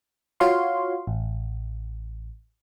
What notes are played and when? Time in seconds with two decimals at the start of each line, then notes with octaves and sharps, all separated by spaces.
0.40 F4 F#4 C#5 F5 C6
1.07 A1